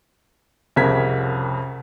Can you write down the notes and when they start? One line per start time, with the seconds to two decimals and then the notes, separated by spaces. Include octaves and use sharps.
0.76 C2 F2 C#3 A#4 G#6 B6